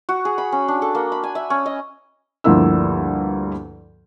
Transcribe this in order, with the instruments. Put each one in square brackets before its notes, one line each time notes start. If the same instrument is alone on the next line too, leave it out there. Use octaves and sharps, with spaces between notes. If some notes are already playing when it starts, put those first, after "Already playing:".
[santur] F#4
G#4
B5
C#4
D4
A4
A#3
B5
G#5
E5
C#4
D#5
[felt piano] D2 G2 F3 A#3 E4 E6